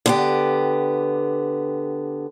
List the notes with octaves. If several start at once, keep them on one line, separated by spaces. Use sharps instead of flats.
D3 B3 G4